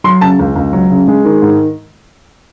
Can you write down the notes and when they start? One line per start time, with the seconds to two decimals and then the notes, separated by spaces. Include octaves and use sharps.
0.04 F#3 C6
0.21 C#3 A5
0.39 C#2
0.56 C#2
0.73 F#3
0.90 C#3
1.08 G#3
1.25 D#3
1.42 G#2